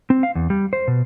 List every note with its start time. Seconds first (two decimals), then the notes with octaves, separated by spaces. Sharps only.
0.10 C4
0.23 F5
0.35 E2
0.50 G3
0.73 C5
0.88 B2